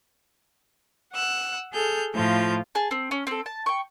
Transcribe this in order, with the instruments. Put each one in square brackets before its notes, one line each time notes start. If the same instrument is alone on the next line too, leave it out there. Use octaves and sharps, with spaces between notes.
[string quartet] F#5 E6 F#6
G#4 A4 F6 G6
A2 F3 F4 G6
[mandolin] G#4 A5
C4
C#4
C4 A4
A5
G5 C#6